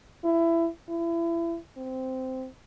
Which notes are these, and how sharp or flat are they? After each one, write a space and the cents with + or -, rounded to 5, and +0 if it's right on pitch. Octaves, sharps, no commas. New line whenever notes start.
E4 +20
E4 +30
C4 -10